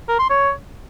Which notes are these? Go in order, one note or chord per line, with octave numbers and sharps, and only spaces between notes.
A#4
C6
C#5